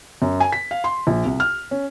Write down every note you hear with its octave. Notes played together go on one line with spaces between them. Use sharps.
F#2
G#5
B6
F5
C6
A#1
C2
F6
C#4